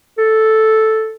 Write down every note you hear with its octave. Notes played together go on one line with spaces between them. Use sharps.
A4